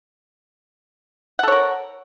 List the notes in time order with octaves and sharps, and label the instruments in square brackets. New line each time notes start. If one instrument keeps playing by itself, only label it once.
[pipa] F#5
A4
C#5
A#4